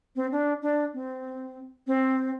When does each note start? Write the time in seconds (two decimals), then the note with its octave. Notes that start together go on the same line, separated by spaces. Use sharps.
0.16 C4
0.32 D4
0.62 D4
0.94 C4
1.87 C4